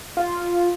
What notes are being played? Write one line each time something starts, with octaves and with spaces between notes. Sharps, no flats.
F4